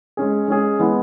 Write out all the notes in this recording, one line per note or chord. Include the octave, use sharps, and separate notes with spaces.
G#3 C#4 G#4
G#3 C#4 G#4
E3 G#3 B3